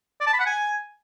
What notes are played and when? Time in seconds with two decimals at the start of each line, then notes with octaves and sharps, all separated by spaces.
0.21 D5
0.27 A5
0.33 B5
0.40 F#5
0.46 G#5